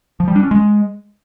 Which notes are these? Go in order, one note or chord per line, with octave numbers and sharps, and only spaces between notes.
F3
G3
D4
C#4
G#3